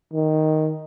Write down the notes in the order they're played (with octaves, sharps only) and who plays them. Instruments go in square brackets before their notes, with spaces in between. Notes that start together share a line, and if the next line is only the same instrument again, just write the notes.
[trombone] D#3